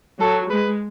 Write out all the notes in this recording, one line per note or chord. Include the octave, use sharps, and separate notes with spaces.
F#3 A4
G#3 B4